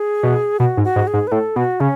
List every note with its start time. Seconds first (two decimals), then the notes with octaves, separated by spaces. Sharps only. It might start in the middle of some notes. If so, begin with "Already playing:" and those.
Already playing: G#4
0.23 B2
0.60 B2 F#4
0.77 G#2
0.84 F#4
0.96 G#2
1.07 G#4
1.13 G#2
1.27 B4
1.32 A2 A4
1.56 B2 F#4
1.80 C#3 C#4